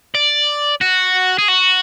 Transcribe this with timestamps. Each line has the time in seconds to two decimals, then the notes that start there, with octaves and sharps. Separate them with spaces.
0.15 D5
0.81 F#4
1.38 G#4
1.48 F#4